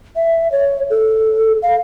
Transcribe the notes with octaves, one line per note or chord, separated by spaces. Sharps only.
E5
C#5
A4
F5